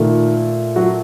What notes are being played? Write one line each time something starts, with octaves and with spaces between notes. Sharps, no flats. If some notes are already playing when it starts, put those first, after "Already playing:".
Already playing: A#2 D#3 A3
F#3 F#4